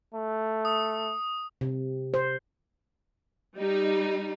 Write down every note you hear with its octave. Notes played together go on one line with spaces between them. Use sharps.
A3
D#6
C3
C5
G3 D#4